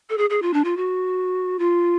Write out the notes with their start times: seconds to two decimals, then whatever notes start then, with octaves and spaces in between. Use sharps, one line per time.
0.10 A4
0.18 G#4
0.30 G#4
0.42 F4
0.53 D4
0.64 F4
0.77 F#4
1.59 F4